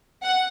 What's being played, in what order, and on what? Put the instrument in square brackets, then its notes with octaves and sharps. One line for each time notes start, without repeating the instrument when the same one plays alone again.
[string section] F#5